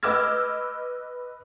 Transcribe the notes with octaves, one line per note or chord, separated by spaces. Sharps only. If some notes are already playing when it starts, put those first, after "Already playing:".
B4 D#5 D6 E6 F6 G#6